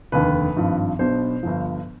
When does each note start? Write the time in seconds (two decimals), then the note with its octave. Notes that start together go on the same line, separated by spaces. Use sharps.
0.12 F1 D#2 D3 B4
0.56 G#1 G2 F3
0.99 B1 B2 B3 D4 C5
1.43 G1 G2 F3